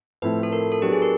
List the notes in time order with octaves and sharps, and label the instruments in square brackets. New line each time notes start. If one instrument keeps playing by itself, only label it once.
[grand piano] A2 F3 A3 C4 E4 [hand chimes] B4
[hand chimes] A4
A#4
A4
[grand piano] F#3 B3 D4 [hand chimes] G4
[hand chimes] G#4
A#4